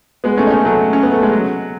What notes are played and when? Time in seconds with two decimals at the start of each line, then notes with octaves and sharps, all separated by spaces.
0.24 G#3 B3
0.37 A3 C#4
0.47 D#4
0.50 A3 C#4
0.65 F#3 A3
0.93 C#4
1.03 B3
1.12 A3
1.23 G#3
1.31 F#3